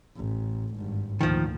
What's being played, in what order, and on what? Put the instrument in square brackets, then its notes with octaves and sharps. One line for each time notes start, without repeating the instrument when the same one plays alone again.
[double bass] A1
G#1 G2
[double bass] D2 A#2 [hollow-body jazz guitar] D#3 F3